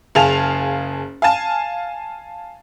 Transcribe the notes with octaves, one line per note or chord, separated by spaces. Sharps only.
F#1 G#4 F5 A5 F7
F5 G#5 A5